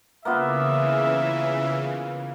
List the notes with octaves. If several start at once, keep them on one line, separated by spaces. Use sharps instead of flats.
C#3 E3 A#3 B3 F4 E5